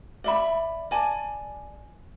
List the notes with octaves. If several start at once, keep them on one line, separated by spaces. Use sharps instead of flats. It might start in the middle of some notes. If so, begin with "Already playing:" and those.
D5 E5 B5
D5 G#5 A5